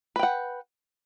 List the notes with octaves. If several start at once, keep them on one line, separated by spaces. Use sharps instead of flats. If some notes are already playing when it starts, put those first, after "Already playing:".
B4 F#5 G5